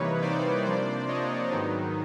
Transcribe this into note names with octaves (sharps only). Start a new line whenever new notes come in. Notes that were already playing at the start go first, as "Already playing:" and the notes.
Already playing: C3 E3 G3 A#3 D#4 B4 C#5
C5 D5
C3 F3 A#3 D4 C5 D5
C#5 D#5
G#2 D#3 F#3 B3 D#4